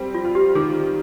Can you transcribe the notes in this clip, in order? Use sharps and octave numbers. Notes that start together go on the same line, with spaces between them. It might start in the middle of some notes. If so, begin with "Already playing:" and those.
Already playing: G3 C4
F4
F4
G4
D#3 G#4